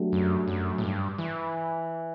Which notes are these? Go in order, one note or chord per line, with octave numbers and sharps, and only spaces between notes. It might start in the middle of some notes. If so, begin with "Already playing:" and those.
Already playing: F#3 A3 D4 G4
F#2
F#2
A2
G2
E3